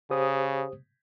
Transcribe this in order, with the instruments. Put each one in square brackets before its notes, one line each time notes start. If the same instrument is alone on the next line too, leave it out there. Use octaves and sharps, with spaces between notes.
[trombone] C#3 [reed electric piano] G4 C5 D#6